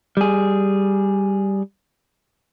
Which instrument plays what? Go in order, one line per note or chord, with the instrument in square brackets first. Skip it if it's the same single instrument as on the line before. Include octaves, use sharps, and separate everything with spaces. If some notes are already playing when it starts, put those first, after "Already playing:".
[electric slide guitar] G3 G#4